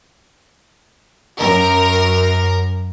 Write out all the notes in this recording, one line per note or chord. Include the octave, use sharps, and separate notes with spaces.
F#2 A#4